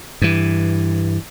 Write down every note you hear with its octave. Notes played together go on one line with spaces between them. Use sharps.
G2 E3